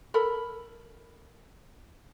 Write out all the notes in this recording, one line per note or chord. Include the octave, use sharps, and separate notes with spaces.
A4 A#4 B5